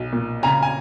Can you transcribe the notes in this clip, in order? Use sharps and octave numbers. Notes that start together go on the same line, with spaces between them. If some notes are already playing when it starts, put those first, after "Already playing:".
Already playing: B1
A#2
C#3 G#5 A#5
G#5